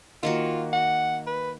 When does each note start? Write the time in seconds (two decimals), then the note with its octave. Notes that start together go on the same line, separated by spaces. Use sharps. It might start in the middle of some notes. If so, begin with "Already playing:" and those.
0.23 D#3 A#3 F4 F#4
0.73 F#5
1.27 B4